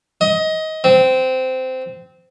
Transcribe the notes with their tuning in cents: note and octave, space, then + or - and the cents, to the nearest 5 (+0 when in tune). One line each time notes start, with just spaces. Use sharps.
D#5 +20
C4 -15